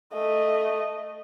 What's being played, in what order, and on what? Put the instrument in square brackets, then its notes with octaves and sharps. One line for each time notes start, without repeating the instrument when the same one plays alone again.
[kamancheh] A3 D#5